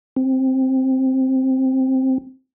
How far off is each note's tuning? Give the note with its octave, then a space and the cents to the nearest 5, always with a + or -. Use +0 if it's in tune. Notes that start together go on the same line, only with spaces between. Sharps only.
C4 +5